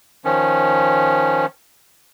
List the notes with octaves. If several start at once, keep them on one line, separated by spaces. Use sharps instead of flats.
D#3 F3 C#4